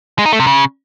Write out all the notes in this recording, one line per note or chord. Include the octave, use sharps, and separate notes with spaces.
G#3
D#4
A3
C3
C#3